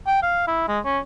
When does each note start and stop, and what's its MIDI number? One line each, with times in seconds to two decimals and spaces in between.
0.07 0.22 79
0.22 0.47 77
0.47 0.67 64
0.68 0.79 56
0.85 0.99 61